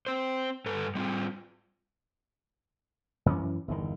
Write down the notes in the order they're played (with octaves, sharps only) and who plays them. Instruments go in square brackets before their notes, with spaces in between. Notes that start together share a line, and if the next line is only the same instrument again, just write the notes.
[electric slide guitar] C4 C5
G2 A4 B4
G3 C4 F4
[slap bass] F#2 E3 C#4
G1 E2 D#3